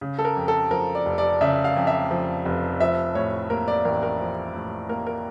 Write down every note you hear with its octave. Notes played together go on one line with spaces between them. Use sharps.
C#3
A4
A#4
F2
A4
F3 A#4
D5
F1
D5
C#3 E5
F5
F2
E5
F3
F1
F3 E5
A2 C#5
A#3 A#4
D5
A1 A#4
A#4
F3
A2
A#3 A#4
A#4